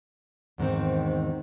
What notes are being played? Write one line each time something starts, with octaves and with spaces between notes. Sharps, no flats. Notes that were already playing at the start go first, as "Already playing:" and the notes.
E2 G#2 D#3 C4